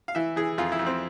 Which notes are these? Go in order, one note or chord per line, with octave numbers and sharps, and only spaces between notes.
F5
E3 E5
E3 G#4
F2 F4
E4
F2
C4